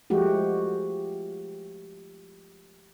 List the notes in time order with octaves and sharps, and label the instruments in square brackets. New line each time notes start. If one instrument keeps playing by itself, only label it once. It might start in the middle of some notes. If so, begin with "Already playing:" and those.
[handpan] F3 G#3 A3 F#4 G4